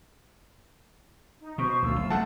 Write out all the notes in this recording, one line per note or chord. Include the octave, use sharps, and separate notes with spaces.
D#4
B2 C5 C#6
D2 F4 E6
F#1
C#3 G#3 A3 F#5 A5